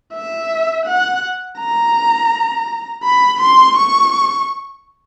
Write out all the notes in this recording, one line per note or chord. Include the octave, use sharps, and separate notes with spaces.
E5
F#5
A#5
B5
C6
C#6